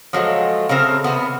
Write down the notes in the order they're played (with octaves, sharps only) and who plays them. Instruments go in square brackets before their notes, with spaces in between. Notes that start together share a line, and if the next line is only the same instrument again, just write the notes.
[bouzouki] F3 F#3 G#3 A3
C#3 A3 C4 A#4
C3 E3 B3